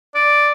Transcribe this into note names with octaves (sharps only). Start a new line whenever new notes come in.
D5